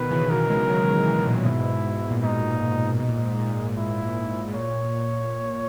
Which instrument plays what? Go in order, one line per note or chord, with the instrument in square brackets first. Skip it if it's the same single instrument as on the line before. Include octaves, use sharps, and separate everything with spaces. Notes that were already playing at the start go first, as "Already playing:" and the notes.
Already playing: [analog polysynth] B2 D#3 [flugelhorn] B4
[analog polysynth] C#3 E3
[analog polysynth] D#3 F#3 [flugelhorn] A#4
[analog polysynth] E3 G#3
D#3 F#3
C#3 E3
A#2 C#3
[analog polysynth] G#2 B2 [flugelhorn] E4
[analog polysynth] A#2
[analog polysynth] G#2 B2 [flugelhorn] D#4
[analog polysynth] B2 [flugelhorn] D#4
[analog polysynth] A#2
G#2
A#2
A#2
G#2
G#2
[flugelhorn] E4
[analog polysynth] G#2
[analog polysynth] A#2 [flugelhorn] C#5